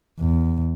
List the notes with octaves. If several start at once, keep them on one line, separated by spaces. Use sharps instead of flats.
E2